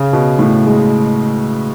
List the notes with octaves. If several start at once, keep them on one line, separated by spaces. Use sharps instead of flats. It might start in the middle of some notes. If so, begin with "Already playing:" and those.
Already playing: C#3
B2
A2
G#3